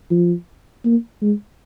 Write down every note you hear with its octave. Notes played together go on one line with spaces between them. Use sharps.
F3
A#3
G#3